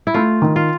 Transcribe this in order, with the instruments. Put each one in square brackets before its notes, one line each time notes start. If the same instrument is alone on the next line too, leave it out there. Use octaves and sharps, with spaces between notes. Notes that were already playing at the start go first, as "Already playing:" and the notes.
[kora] E4
[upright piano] A3 [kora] F4
[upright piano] D#3
[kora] F4